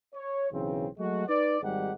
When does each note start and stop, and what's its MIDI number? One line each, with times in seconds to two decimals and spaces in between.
0.15 0.50 73
0.52 0.88 35
0.52 0.88 49
0.52 0.88 52
0.52 0.88 60
0.99 1.27 54
0.99 1.27 56
0.99 1.27 57
0.99 1.27 66
1.28 1.58 63
1.28 1.58 71
1.28 1.58 74
1.63 1.92 32
1.63 1.92 44
1.63 1.92 55
1.63 1.92 67
1.63 1.92 78